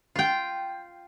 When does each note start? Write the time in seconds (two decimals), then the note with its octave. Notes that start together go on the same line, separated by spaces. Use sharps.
0.16 F4 G5